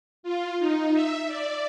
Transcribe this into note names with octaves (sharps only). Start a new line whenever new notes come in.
F4
D#4
E5
D5